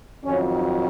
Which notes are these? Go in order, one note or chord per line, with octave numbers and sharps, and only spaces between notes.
F2 D#3 F#3 C#4
D#4